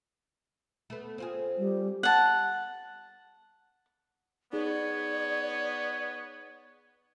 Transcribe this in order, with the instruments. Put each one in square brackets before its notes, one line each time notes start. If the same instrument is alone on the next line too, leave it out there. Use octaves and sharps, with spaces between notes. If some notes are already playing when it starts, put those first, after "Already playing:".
[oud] A3 B3
C4 F4 G#4
[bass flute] G3
[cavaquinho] F#5 A5
[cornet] B3 [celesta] D#4 G#4 [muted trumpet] C#5 [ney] D5